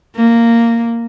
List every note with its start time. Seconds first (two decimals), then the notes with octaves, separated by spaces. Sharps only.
0.16 A#3